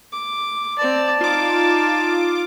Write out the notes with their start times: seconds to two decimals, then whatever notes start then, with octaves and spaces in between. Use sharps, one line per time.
0.12 D6
0.79 C4 D5 A5
1.21 D#4 F4 D6